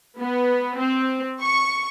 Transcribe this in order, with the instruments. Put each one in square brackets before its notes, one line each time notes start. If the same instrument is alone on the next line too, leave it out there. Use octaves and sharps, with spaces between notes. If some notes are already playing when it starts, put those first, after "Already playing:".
[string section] B3
C4
C#6